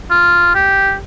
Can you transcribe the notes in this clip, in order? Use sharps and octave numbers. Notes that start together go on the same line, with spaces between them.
F4
G4